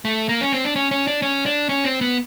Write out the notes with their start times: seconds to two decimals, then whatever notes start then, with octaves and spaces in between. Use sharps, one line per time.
0.05 A3
0.29 A#3
0.41 C#4
0.52 C4
0.64 D4
0.76 C#4
0.91 C#4
1.07 D4
1.22 C#4
1.46 D4
1.69 C#4
1.84 C4
2.01 B3